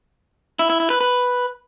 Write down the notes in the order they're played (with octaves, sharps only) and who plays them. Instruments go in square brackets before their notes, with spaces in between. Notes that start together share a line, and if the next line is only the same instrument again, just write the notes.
[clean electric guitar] E4
E4
E4
B4
B4